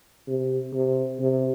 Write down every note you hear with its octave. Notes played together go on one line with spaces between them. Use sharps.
C3
C3
C3